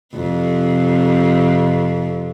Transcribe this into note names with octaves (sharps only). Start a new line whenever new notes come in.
F2 C3